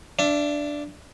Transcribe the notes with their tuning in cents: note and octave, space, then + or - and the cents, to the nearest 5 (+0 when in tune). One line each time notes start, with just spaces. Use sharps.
D4 +0 E5 +40